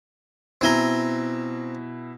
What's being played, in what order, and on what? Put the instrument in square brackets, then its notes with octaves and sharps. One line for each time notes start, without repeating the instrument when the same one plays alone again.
[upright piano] B2 E4 G7 [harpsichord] C4 G#5 A#5